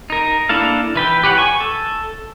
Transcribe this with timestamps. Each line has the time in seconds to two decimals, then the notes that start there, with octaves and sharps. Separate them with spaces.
0.10 D#4 A#4
0.49 A#3 D4 E4 A4 F5
0.96 E3 B4 G5
1.24 G4 B4 C#5 F#5
1.38 G#5 C#6
1.60 A4